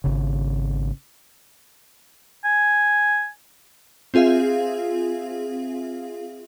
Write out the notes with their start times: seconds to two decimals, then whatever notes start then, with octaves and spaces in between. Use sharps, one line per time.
0.04 G#1 C#3
2.45 G#5
4.14 C4 F4 G#4 E5 F5